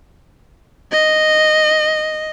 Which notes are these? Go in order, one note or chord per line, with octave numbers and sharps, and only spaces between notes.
D#5